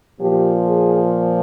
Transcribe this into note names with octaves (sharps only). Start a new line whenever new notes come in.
A#2 F3 G4
G#4